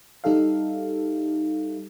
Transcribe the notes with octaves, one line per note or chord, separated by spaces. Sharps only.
G3 D#4 G4 A4 E5 F5